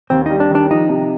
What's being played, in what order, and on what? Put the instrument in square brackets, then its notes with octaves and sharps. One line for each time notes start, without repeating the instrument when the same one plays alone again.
[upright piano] D#2 [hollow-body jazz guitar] C4
[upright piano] G3 [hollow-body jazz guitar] D#4
[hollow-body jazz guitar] D4
[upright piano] D#3 [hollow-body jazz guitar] D4
[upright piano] F3 [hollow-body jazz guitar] D#4
[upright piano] C3